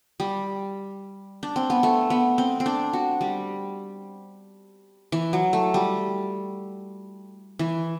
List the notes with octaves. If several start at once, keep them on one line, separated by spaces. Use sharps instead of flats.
G3
D4
C4
B3
A3
B3
C4
C4
D4
F#4
G3
E3
F#3
A3
G3
E3